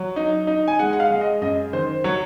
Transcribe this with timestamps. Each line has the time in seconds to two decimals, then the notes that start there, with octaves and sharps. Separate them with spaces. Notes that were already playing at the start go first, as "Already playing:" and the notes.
Already playing: F#3
0.16 D#4
0.47 D#4
0.68 G#5
0.79 G#3 F#5
0.93 F#5
1.00 F5
1.11 G#3
1.21 D#5
1.41 F#2 D#5
1.73 D#3 C5
2.04 F#3 C#5